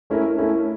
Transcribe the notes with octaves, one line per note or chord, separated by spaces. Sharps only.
A3 C#4 E4 A#4
A3 C#4 E4 A#4